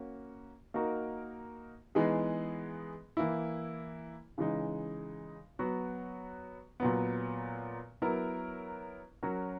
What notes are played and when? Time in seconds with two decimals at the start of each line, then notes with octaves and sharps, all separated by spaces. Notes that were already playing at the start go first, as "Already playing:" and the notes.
Already playing: A#3 C#4 F#4
0.74 A#3 D#4 F#4 A#4
1.95 E3 G#3 B3 D#4 G#4
3.17 E3 A#3 E4
4.38 C#3 E3 G#3 D#4
5.59 F#3 B3 F#4
6.80 A#2 F#3 B3
8.02 F#3 B3 E4 A#4
9.23 F#3 C#4 F#4 A#4